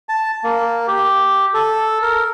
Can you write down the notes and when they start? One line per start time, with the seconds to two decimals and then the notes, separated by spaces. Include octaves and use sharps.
0.09 A5
0.44 A#3
0.87 G4
1.54 A4
2.02 A#4